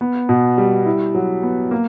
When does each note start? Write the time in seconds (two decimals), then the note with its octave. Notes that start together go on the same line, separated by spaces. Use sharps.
0.01 B3
0.29 B2
0.58 G3
0.86 E4
1.15 F#3
1.43 B3
1.71 A#3